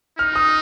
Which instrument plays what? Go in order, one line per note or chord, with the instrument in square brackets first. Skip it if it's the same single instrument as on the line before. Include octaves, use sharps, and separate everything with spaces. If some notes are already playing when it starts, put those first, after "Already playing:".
[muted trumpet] D#4 [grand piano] F6
[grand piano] D#6